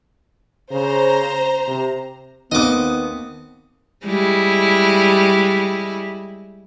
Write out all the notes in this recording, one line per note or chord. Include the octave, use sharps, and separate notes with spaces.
C#3 C5 A#5
C3
D#2 B3 C4 D#5 D6 D#6
G3 G#3 E4